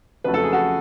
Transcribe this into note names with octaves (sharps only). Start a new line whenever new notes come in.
F2 C#3 F#3 A3 B4
A4
G#4
F#4 A4